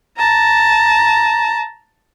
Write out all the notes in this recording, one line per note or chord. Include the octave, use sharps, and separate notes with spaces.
A5 A#5